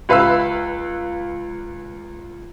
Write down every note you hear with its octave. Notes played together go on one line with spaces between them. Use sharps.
C#2 B4 F5 B5 E6